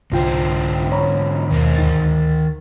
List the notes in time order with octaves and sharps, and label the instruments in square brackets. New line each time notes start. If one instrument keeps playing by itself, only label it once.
[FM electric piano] C2 F4 G5 [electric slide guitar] G#2 D3 C5
[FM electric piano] C#5 A#5 B5
[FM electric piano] D#2 B2 [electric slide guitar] D#3 A#4 C5
[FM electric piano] D2 D#4 A6